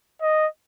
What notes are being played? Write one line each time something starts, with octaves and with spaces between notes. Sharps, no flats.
D#5